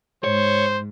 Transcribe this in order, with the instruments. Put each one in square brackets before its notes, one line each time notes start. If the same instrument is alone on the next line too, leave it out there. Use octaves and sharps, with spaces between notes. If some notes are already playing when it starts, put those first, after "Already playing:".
[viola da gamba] G#2 [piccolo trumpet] C5 [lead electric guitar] C#5